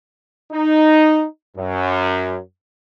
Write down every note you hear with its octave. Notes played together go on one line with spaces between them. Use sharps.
D#4
F#2